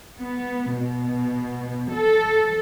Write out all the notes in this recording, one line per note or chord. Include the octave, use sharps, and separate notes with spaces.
B3
B2
A4